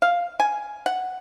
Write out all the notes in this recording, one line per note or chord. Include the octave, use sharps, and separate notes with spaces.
F5
G#5
F#5